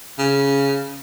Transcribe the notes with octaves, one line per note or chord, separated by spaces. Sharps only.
C#3